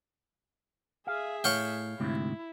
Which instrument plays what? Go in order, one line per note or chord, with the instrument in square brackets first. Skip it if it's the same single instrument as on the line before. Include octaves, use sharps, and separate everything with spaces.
[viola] G#4 E5 [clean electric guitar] F5
[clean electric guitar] A2 [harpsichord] C#5 F5 G5
[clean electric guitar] D2 G#2 C3 [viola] E4